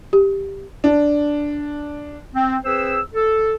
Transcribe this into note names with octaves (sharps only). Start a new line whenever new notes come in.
G4
D4
C4
C4 G#4 B4 C5 E6
A4